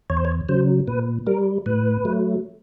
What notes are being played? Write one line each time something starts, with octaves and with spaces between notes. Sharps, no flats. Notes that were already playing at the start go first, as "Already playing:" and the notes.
E2 C#5
C5
C#5
C#3 F#3 C5
A#2 B4
G3 A#4
A2 B4
F#3 A3